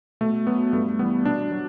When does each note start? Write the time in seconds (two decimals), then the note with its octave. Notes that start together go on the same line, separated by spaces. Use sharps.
0.21 B2 A3
0.47 F#3 B3
0.73 G2 A3
0.99 E3 G3 B3
1.25 B2 D4
1.52 F#3